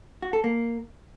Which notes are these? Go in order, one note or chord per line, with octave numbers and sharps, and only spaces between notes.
F#4
A4
A#3